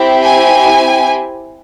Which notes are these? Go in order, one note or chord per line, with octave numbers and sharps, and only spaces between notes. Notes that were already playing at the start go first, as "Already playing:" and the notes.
Already playing: C4 E4 G4
G#5